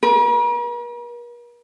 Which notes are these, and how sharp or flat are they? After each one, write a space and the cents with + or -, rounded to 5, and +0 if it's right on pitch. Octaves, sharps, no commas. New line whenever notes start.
A#4 +45